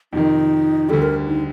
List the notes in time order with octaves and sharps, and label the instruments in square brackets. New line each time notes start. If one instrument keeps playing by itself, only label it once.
[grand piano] F2 C3 D#3 [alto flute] D#4
[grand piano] D2 D3 G3 [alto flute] A4
[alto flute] A#4
D#4